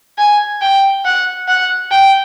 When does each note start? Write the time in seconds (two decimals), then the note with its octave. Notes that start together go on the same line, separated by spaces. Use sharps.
0.18 G#5
0.62 G5
1.05 F#5
1.48 F#5
1.91 G5